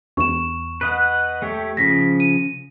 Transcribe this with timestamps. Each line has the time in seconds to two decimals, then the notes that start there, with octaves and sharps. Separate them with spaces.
0.17 E2 C#6 E7
0.81 B4 D#5 F#5
1.42 A3 G4 C#5
1.77 C#3 F3 A#6 B6
2.20 D#7